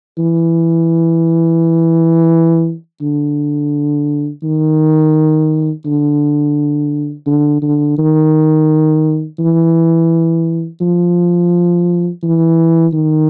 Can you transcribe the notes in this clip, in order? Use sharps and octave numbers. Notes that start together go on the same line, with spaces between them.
E3
D3
D#3
D3
D3
D3
D#3
E3
F3
E3
D#3